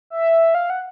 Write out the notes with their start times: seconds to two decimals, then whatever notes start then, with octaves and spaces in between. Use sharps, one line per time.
0.10 E5
0.55 F5
0.70 F#5